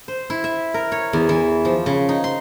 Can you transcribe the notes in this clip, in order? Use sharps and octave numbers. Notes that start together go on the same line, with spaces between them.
C5
E4
E5
A#4
C#5
E2
E3
F3
C#3
D#4
C6